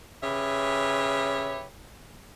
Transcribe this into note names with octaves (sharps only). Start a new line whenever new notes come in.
C#3 G4 B4 C#5 E5